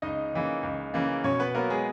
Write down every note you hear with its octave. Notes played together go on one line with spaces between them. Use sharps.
C#2 D#4 D#5
C#3 E3 A#3
C#2
C#3 E3 A#3
B2 C#4 C#5
B3 B4
F#3 A#3 B3 A#4
G#3 G#4